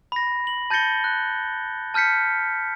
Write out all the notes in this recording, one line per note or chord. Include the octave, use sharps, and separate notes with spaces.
B5 A#6
F#7
A5 G6 A6 A#6 C#7 G7
F#6
A5 F6 G6 B6 C#7